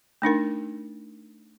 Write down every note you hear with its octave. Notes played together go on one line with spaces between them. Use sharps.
A3 D4 D#4 A#4